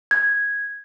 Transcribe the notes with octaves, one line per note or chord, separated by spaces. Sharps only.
G#6